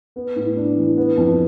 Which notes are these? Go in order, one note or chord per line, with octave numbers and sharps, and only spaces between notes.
B3
A2
D4
E3
B3
F2